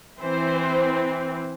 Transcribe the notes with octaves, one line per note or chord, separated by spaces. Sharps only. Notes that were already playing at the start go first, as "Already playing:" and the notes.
E3 C4 C5